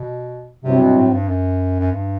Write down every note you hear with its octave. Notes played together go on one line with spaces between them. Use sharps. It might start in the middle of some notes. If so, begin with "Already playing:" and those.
Already playing: B2
G2 C3 F#3 C4 E4
B2
A2
G2
F#2
F#2
G2